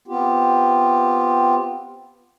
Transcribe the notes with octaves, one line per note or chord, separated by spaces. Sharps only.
B3 C4 F4 G4